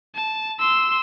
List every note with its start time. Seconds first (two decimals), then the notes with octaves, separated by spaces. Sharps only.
0.15 A5
0.60 C6 E6